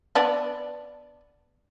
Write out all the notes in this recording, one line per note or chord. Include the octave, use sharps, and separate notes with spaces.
B3 D4